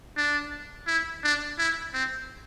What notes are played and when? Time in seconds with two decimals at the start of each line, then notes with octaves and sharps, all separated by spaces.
0.17 D4
0.87 E4
1.23 D4
1.58 E4
1.94 C4